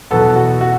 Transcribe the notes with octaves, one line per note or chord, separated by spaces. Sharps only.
E2 B2 F#3 B3 A4
F#4
F#4